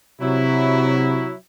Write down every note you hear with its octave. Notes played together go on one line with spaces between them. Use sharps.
C3 F#3 E4